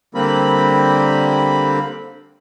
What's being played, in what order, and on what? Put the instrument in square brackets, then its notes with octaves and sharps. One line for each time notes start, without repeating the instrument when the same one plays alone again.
[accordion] D3 G3 A#3 C4 B5